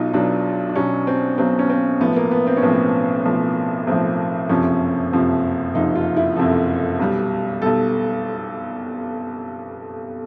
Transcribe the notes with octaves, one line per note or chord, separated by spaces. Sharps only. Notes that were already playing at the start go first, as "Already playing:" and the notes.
Already playing: B1 B2 F#3 D#4 F4
B1 B2 F#3 D4
D4
B1 B2 F#3 C#4
C4
B1 B2 F#3 C4
C#4
C4
B1 A2 F3 B3
A#3
B3
C4
C#4
B1 A2 F3 C4
B1 A2 F3
B1 A2 F3 C4
F#1 F2 C3 F3 C#4
F#1 F2 C3 F3
F#1 F2 C3 F3 D#4
F4
E4
F#1 F2 C3 F3 A4
B1 B2 G3
B1 B2 G3 A4